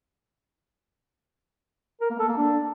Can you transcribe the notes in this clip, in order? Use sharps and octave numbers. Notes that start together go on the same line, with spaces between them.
A#4
A#3
A4
A#3
D4